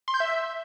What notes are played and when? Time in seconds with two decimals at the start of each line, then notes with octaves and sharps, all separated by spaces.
0.08 C6
0.14 G6
0.20 E5